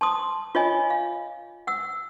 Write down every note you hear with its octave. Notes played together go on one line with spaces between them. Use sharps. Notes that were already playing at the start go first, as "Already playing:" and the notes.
A5 C6 D#6
F4 C#5 D#5 G#5
F5
F#5 E6